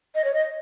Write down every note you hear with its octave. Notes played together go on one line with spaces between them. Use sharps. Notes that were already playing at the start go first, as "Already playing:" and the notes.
D#5
C#5
D#5